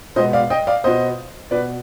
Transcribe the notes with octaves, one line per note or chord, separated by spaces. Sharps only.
B2 G#3 B3 C5 D#5
D5 F5
D#5 G5
D5 F5
B2 B3 C5 D#5
B2 B3 B4 D5